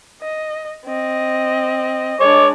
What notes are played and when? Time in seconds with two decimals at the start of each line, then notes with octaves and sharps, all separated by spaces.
0.22 D#5
0.86 C4 D#5
2.20 G#3 D4 C#5 D6